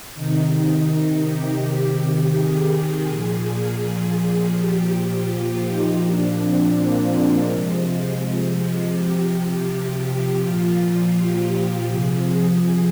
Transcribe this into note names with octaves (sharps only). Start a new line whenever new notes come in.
C3 D#3 D#4
G4
C3 D#3 G4
G#4
A#2 F3 G#4
A#2 F3 G4
F4
D#4
A#2 F3 D4
C4
A#3
G#3
C3 F3 G#3
G#3
G#3
C3 F3 G4
G4
G4
A#2 F3 F4
G4
C3 F3 G#4